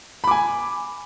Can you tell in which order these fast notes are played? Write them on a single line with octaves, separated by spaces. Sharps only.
B5 D6 G#5